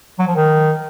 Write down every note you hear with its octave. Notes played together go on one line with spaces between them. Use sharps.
F#3
F3
D#3